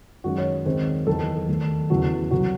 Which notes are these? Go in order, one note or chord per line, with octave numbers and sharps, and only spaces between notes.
F#2 D#3 G#3 C#4 F#4
C#5
D#2 D#3 G#3 C4 C5
E2 D#3 F#3 A4
D#2 D#3 A3
E2 C#3 E3 F#4
C2 C3 F#3 F#4